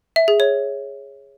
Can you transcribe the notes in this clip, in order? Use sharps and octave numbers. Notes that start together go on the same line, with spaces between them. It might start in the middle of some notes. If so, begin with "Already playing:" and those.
E5
G#4
C#5